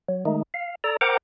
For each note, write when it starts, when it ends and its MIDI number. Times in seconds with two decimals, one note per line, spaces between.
0.09 0.24 54
0.25 0.43 51
0.25 0.43 56
0.25 0.43 57
0.25 0.43 63
0.54 0.75 77
0.84 0.97 69
0.84 0.97 74
0.84 0.97 82
1.01 1.17 70
1.01 1.17 72
1.01 1.17 78
1.01 1.17 79
1.01 1.17 82
1.01 1.17 86